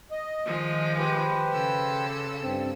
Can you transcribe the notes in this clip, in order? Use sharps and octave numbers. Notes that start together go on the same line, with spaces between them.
D#5
D#3 F3 G#3
G4 B4 C5
C#3 A4 E6
G2 C4